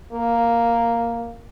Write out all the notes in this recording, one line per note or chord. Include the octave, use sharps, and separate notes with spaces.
A#3